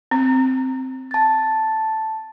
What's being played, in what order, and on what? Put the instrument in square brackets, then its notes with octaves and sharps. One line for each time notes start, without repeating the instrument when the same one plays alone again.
[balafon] C4
[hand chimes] A5 A6